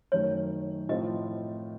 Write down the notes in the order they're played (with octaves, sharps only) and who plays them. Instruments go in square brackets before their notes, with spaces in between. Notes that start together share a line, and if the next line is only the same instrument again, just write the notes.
[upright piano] F#2 D#3 A3 [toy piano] C#5
[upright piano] A2 F3 C4 F4 [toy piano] D#5